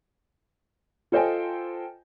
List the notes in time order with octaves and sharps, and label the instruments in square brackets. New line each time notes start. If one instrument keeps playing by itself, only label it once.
[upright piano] F4 A4 C5 D#5 G5 G#5